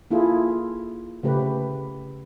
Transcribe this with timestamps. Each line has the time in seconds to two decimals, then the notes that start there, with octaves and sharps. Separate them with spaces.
0.10 A#3 E4 F4 G#4 A4
1.23 C#3 A3 G4 B4